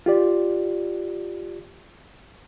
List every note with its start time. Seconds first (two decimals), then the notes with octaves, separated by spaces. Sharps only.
0.06 F4 G4 D5